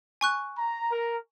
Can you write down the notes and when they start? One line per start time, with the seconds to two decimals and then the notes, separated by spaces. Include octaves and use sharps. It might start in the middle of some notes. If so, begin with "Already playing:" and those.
0.21 G#5 C#6 F#6
0.58 A#5
0.91 A#4